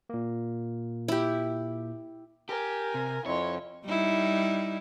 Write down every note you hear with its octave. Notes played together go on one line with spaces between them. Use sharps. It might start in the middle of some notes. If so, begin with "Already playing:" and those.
A#2 A#3
E4 G4
G4 A#4 G#5
C3
F2 E4 C#5 C6
G3 D#4 E4